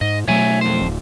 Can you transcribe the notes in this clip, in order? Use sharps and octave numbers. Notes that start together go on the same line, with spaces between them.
G#2 D#5
B2 F#3 A3 C#5 E5 G#5
F2 C5
D1